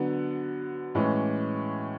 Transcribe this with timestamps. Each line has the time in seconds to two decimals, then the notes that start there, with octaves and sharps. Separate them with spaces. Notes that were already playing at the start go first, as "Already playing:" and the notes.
Already playing: D3 F#3 B3
0.95 A2 E3 G#3 C#4